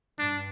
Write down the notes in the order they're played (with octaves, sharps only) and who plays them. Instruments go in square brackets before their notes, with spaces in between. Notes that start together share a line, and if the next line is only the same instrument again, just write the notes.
[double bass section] G2 [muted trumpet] D4